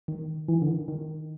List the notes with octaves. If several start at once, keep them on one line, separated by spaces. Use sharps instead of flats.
D#3
E3
D3
D#3
D#3